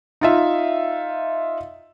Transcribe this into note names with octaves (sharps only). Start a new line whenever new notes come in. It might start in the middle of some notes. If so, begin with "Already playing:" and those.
D#4 F4 E5